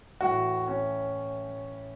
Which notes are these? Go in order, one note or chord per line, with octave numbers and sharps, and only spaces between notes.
A2 E3 F#4
C#4